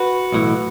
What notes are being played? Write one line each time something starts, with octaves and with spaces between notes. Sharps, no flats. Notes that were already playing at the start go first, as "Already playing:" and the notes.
Already playing: F#4 B4
B1 A2 E3